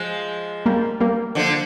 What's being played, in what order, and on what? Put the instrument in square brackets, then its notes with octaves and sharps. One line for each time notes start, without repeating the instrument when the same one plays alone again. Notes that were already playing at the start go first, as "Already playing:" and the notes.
Already playing: [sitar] F3 G#3
[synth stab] G3 A#3
G3 A#3
[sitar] D3 F3